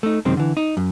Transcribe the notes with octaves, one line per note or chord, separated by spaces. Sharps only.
A3 D#4
F#2 C3 D#3 G#3 C4
D3 E3
D#4
F#2